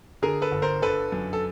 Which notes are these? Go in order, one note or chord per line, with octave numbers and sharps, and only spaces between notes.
D3 G#4 A#4
A4 B4
G1
A#4 C5
D3 A4 B4
F#2
A4